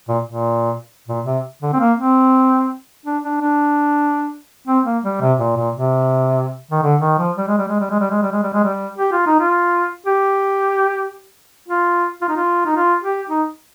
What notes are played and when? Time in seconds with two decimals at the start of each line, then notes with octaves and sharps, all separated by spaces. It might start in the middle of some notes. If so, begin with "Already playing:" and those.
0.09 A#2
0.27 A#2
1.08 A#2
1.26 C3
1.62 D3
1.73 C4
1.80 A#3
1.97 C4
3.06 D4
3.24 D4
3.41 D4
4.67 C4
4.86 A#3
5.04 G3
5.21 C3
5.39 A#2
5.57 A#2
5.75 C3
6.71 D#3
6.83 D3
7.01 D#3
7.19 F3
7.37 G3
7.48 G#3
7.58 G3
7.68 G#3
7.80 G3
7.90 G#3
8.00 G3
8.11 G#3
8.22 G3
8.32 G#3
8.43 G3
8.53 G#3
8.64 G3
8.98 G4
9.12 F4
9.27 D#4
9.40 F4
10.06 G4
11.68 F4
12.22 F4
12.29 D#4
12.36 F4
12.66 D#4
12.76 F4
13.03 G4
13.29 D#4